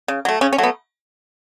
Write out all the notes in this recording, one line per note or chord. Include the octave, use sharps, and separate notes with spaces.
C#3
F#3 A3
C#3 C#4
C#4
F#3 A3
B3